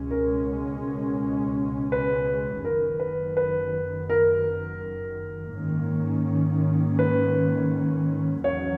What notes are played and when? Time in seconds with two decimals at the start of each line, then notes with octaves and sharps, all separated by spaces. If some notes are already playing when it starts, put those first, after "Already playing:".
Already playing: C#2 B2 G#3 C#4
0.11 A#4
1.92 B4
2.64 F#1 F#2 D#3 A#4
3.00 B4
3.37 B4
4.10 A#4
5.54 G#2 D#3 A#3 C#4
6.99 B4
8.44 E2 D#3 F#3 C#4 C#5